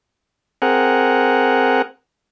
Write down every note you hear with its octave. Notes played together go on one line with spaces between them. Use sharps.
C4 G#4 A#4 F#5